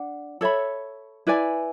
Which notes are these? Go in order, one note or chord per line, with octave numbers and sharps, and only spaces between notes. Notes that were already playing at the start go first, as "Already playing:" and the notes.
Already playing: D4 F#5
A4 C#5 E5 B5
E4 B4 D5 G#5